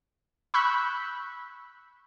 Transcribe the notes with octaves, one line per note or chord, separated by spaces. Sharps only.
B5 C#6 E6 F#6 G6 B6